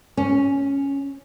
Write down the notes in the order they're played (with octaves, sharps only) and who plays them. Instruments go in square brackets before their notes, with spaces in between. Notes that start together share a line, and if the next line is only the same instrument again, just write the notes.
[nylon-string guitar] C#4